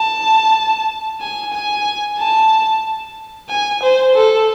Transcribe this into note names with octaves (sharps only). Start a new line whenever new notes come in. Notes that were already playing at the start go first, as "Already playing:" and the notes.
Already playing: A5
G#5
G#5
A5
G#5
C5
A4